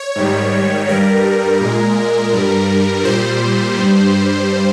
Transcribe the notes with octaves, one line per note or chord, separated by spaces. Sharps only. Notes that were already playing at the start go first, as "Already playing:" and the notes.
Already playing: C#5
G#2 D#3 G3
G2 G3 A#4
A#2 G#3
G2 G3
A#2 G3 C5
G2 G3